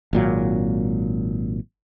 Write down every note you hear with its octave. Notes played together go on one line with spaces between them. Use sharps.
G#1 A#2 F#3